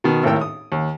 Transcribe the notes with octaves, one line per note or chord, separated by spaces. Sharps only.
B2 D#3
G#1 D#2 A2 A#4 G5 E6
D#6
D#2